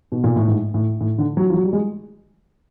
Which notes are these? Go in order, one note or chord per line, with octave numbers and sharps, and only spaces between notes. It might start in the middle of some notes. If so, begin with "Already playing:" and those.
B2
A#2
A2
G#2
A2
A2
D3
F#3
F3
F#3
G3
G#3